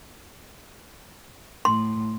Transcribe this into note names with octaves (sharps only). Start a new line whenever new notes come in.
A2 C6